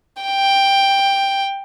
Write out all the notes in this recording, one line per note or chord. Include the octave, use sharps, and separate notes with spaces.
G5